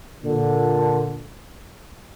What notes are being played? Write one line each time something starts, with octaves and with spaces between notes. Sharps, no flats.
A#2 D3